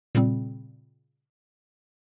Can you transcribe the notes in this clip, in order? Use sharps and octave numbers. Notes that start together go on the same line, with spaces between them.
A#2 C#3 G3 C4